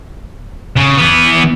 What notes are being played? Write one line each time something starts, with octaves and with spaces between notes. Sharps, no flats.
C#3
E3 B3